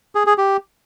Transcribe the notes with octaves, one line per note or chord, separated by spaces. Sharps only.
G#4
G#4
G4